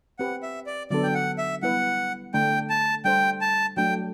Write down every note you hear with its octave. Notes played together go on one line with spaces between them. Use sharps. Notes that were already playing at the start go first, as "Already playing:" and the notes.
C4 G4 B4 F#5
E5
D5
D3 F#3 B3 D4 A4 D5
G5
F#5
E5
G3 B3 E4 B4 F#5
D3 A3 D4 G5
A5
G3 D4 A4 C5 G5
A5
F#3 A3 D4 G5